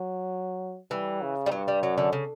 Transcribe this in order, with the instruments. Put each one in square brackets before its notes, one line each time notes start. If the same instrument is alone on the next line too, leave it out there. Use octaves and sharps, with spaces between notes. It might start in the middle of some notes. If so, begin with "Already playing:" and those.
Already playing: [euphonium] F#3
[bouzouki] E3 [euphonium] G3
[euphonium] C#3
[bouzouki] G3
[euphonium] G2 [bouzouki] F#3
[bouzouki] G3
[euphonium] F#2 [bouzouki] F#3
[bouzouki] D3
C#3